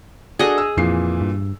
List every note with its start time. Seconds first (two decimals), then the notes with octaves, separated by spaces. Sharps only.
0.39 D4 F#4 G#4 A4 D#5
0.58 E6
0.77 F2 A#2 E3 C7
1.21 G2